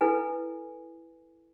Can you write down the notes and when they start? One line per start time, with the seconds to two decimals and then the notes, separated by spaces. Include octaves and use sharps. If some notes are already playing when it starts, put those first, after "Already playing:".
0.01 E4 A4 B4 G#5